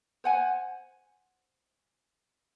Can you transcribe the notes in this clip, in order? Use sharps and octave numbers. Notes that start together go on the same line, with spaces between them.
C5 F#5 G#5